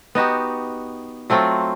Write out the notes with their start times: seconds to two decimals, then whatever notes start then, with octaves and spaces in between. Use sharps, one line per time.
0.15 B3 D#4 F#4 G4
1.30 F#3 A3 C4 F4